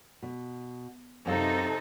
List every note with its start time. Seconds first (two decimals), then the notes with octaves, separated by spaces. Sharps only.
0.22 B2
1.26 F#2 C3 D#4 A4 F5